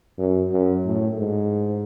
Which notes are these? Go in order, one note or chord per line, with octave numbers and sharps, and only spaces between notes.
F#2
F#2
A2
G#2